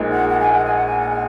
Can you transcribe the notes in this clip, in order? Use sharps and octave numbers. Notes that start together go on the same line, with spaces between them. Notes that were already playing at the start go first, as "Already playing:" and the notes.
Already playing: A#1 A#2 G#3 D#4
F#5
F#5
G#5
F#5
G#5
F#5
G#5
F#5
G#5